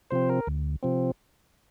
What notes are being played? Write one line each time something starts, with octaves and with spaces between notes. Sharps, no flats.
C3 F3 C4 C5
A#4
D2
C3 F3 C4